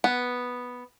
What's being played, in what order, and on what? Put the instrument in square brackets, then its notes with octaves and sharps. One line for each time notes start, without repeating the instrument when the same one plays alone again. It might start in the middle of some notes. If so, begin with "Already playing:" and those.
[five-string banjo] B3